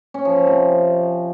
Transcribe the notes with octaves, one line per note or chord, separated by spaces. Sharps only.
C#4
F3
F3
C3